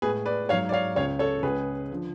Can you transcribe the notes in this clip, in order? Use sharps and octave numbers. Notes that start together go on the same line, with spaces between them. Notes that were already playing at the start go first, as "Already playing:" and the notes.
A2 G#3 G#4 B4
B4 D5
G#2 F#3 C#5 F5
D5
C#5 F5
C#2 C#3 G#3 C#5 F5
A4 C#5
C#2 C#3 G#3 G#4 B4
D3 F3